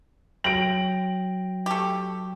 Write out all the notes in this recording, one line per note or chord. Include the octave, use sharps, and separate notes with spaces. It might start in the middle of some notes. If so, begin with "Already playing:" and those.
F#3 G5 A#6 D7 F#7
A3 G4